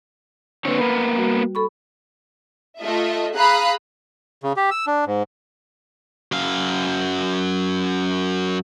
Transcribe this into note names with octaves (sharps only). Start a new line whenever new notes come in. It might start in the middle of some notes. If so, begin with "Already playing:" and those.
D3 A#3 C4 B4 C#5
A#3 B3 B5
G3 F#4
A4 B5 C#6
A3 F4 D#5 E5
G#4 F5 A#5 B5 D#6 F#6
C#3
G4
E6
D4
G#2
F#2 F5